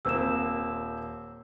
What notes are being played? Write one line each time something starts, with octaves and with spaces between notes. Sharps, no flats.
D#1 A#3 C4 E6 E7